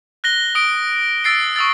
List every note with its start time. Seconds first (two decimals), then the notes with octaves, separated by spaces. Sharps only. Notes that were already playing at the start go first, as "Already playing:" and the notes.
0.24 F#6 A#6 G7
0.55 D#6 D7
1.24 E6 A6 C7 D7
1.56 C#6 D#6 E6 A6